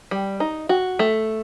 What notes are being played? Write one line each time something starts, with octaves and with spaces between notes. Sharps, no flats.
G3
D#4
F#4
A3